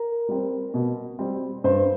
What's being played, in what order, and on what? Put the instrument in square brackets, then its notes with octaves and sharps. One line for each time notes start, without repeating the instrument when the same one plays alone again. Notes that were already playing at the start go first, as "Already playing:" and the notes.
Already playing: [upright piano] A#4
G3 C4
B2
G3 C4
G2 C5